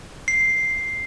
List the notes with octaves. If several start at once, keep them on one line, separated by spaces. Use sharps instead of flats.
C7